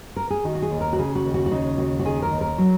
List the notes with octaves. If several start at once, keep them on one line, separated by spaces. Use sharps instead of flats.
A#4
G#4
D#3 F#4
F#4
G#4
D#2
A#4
F#4
C#3 G#4
F#4
D#2
F#4
F#4
C#3 D#4
D#2 F#4
F#4
D#3 G#4
A#4
D#2
A#4
F#3